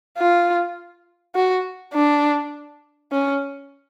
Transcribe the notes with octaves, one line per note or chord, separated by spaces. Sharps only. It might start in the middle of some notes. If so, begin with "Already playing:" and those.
F4
F#4
D4
C#4